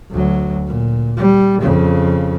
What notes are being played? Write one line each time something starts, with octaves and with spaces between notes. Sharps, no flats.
D2 F#3
A#2
G3
F2 C#3